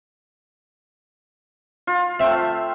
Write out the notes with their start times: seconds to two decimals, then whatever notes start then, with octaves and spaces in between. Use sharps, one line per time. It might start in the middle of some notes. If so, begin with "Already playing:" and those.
1.87 F4
2.20 A3 C4 E5